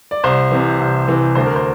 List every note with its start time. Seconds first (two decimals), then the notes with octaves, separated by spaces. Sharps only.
0.11 D5
0.24 C2 C5
0.51 C3 E3
0.80 C2
1.08 C3 E3
1.35 D2 C5
1.46 A#4
1.56 C5